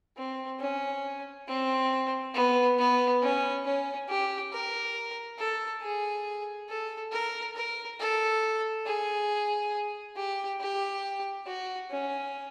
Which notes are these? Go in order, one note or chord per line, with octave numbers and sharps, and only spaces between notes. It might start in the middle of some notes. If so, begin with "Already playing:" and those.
C4
C#4
C4
B3
B3
C#4
C#4
G4
A#4
A4
G#4
A4
A#4
A#4
A4
G#4
G4
G4
F#4
C#4